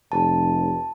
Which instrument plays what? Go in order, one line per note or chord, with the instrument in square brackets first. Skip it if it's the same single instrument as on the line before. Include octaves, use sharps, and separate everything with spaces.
[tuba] F1 [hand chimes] A5